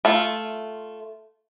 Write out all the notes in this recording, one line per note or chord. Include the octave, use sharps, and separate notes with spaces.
A3 F4